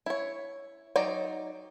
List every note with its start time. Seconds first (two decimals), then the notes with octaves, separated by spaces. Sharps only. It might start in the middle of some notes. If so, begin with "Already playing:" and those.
0.06 E4 C#5
0.96 F#3 D#4 D5 G5